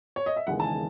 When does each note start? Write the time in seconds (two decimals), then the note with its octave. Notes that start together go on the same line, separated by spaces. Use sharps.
0.16 C#5
0.26 D#5
0.36 E5
0.47 E1 D#2 C#3 E3 G#3 F#5
0.60 A5
0.64 G#5